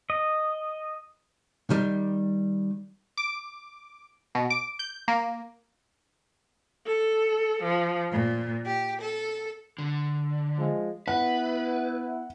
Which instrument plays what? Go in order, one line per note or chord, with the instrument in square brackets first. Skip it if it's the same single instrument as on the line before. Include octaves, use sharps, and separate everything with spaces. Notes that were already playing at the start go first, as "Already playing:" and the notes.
[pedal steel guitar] D#5
[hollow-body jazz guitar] D#3 G3
[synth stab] D6
B2
D6
G6
A#3
[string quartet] A4
F3
A#2
G4
A4
[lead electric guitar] D3
[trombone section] F3 G#3
[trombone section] B3 E4 [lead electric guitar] B4 [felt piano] F#5